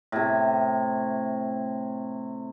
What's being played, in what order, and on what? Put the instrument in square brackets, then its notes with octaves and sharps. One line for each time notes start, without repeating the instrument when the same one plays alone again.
[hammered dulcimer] A2 C3